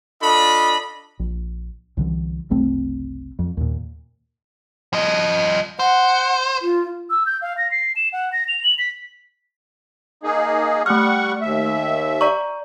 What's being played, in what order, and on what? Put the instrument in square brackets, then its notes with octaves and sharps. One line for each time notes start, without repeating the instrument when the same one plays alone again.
[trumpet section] D4 F4 A4 D#5 B5
[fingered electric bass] A#1
C2 D3 E3
F#1 C2 A3 C4
F2
D#2 A#2
[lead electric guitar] F3 D#5
[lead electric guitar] C5 [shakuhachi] F#5
[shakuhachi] F4
[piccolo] E6
G6
F5
A#6
C7
E7
F#5
A#6
F7
F#7
B6
[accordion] A#3 D#4 G#4
[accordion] G3 F#5 C#6 [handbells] A3 F6
[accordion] D#2 E5
[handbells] D5 A#5 C#6